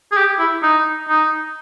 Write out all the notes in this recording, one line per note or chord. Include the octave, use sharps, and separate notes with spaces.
G#4
G4
E4
D#4
D#4